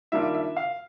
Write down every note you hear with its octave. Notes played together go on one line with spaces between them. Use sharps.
D#3 G3 A#3 D4 F4 E5
E5
F5